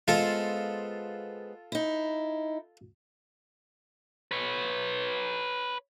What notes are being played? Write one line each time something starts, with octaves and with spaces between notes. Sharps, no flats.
G#3 B3 F4 A4 C5
D#4 E4
B4 C#5